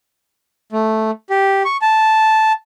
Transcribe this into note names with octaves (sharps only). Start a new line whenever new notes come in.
A3
G4
C#6
A5